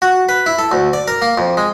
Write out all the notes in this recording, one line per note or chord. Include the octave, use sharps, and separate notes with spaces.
F#4
B4
E4
A4
D2
D5
A#4
A#3
F2
G#3